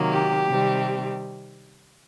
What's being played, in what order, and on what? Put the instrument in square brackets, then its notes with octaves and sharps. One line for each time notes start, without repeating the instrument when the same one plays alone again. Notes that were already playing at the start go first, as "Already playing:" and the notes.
Already playing: [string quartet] C3 D#3 F#3 A#3
G4
C3 D#3 G3 C4